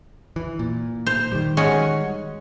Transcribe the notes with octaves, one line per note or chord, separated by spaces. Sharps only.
E3
A#2
C5
D#3 G3
G#3 C#4 F#4